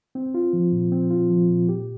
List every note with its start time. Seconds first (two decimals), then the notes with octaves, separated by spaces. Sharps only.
0.15 C4
0.34 F4
0.53 F3
0.72 A#2
0.92 C4
1.10 F4
1.30 F3
1.49 A#2
1.69 G4